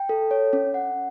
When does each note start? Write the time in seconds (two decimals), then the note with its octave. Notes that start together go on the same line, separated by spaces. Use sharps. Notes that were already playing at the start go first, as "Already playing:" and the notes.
Already playing: G5
0.09 A4
0.31 C#5
0.53 C#4
0.74 F#5